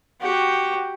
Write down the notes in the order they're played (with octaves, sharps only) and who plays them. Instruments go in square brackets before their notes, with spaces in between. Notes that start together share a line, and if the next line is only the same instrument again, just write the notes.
[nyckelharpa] F#4 G4